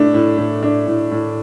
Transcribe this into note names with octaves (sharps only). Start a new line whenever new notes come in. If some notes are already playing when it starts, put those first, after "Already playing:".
Already playing: A2 A3 D4
A2
A2
D4
A2
A2